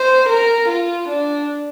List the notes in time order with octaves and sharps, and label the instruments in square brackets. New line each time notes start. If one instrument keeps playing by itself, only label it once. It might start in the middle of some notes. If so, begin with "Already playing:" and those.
Already playing: [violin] C5
A#4
F4
D4